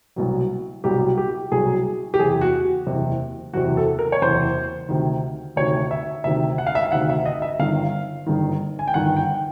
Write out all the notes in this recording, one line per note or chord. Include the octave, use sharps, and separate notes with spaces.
C2 B2 F#3
C2 B2 F#3 G4
G4
C2 B2 F#3 G#4
G4
F#1 E2 C3 G#4
F#4
F#1 E2 C3
F#1 E2 C3 F#4
A4
A#4
C#5
F#1 E2 C3 C5
D2 C3 D#3
D2 C3 D#3 C#5
E5
D2 C3 D#3 E5
F#5
F5
E5
F5
D2 C3 D#3 F#5
E5
D#5
E5
G1 G2 D#3 F5
G1 G2 D#3
G#5
G5
G1 G2 D#3 F#5
G5